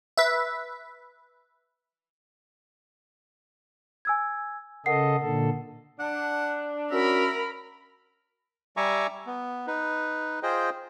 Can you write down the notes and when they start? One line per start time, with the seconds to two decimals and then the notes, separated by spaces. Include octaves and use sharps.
0.18 B4 E5
4.05 G#5 E6 G#6
4.86 C#3 A4 A#4 D#5 F#5 C7
5.21 A#2 D3 A4
5.99 D4 F#5
6.92 C#4 F#4 A#4 E5 B5
8.77 G3 E5 G#5 A#5 C#6 D6
9.26 B3
9.67 D#4 B4
10.43 F4 G#4 C5 D#5 G5